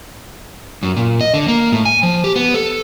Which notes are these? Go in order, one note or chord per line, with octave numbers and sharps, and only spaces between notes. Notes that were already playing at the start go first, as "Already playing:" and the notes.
F#2
A#2
D#5
D3
A#3
A2
G#5
F3
G4
B3
A4